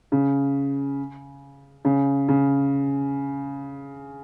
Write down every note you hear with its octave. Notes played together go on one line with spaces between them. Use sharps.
C#3
C#3
C#3